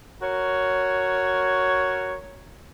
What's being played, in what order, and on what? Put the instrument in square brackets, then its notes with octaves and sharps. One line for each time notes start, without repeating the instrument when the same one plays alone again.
[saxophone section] F#4 A#4 C#5